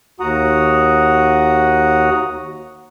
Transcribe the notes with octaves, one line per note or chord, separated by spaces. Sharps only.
D#2 F#4 F#5 A#5 D#6